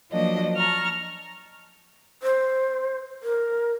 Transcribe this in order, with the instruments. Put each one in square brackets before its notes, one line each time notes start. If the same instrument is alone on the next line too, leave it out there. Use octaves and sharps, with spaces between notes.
[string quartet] F3 F#3 A#3 D4 D#5
A5 A#5 C#6 F6
[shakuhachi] C5
A#4